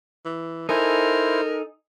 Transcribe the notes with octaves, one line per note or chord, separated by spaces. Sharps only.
E3
D#4 E4 A4 A#4 C5 G#5